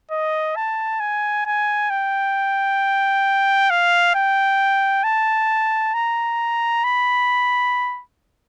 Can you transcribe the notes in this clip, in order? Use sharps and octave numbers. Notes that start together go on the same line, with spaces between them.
D#5
A5
G#5
G#5
G5
F5
G5
A5
A#5
B5